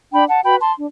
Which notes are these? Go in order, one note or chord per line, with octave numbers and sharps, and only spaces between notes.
D4 G5 B5
F#5 A5
F#4 B4 G5 B5
A5 C6
D4